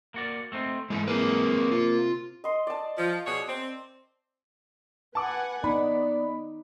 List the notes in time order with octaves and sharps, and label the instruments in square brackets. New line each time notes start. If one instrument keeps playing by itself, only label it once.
[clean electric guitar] A#3 F#4 D5
A3 C4 D#4
[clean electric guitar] G#2 E3 [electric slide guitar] G#3 A4
[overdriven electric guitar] A#3 [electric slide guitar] C4 G#4 B4
[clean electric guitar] C3 [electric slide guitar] F4
[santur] D#5 C6
D5 A5
[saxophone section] F3
B2 G#4 C#5
C4
[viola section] B4 F#5 G#5 [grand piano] A5 D6
[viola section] B3 [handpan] D#4 [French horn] D5 [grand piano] B5